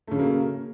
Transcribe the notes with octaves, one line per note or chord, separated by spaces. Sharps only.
C#3 F#3 A3 A#3